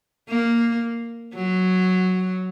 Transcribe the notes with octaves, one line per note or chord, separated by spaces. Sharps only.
A#3
F#3